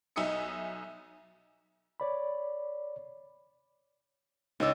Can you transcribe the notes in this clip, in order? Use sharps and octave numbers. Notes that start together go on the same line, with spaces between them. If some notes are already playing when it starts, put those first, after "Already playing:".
B1 D#4 E5 G#5 D#6 C#7
C#5 D5 B5
C#2 D#4 C#5 D5 E6